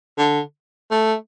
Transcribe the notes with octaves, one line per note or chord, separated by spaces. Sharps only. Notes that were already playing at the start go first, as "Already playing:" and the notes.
D3
A3